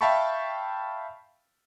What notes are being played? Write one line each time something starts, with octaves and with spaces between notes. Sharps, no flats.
E5 F5 G5 A5 B5 C#6